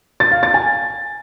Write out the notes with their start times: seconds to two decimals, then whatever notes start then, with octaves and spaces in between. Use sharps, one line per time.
0.20 A6
0.32 F5
0.43 A6
0.54 G#5